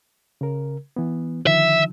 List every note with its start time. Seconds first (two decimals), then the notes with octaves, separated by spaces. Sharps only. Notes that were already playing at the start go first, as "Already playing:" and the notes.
0.41 C#3 A#4
0.96 E3 B3
1.47 D3 D#3 F3 E5